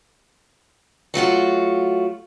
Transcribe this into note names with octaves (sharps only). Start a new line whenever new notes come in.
F#3 A3 F4 F#4